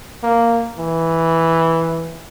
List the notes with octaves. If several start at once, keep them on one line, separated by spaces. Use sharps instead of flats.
A#3
E3